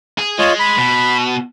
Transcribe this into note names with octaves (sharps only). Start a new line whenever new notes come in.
G#4
G#3 F4 C#5 D#5
B5
B2